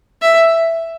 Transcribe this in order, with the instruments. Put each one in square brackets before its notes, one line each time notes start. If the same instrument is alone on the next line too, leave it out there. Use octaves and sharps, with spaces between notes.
[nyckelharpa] E5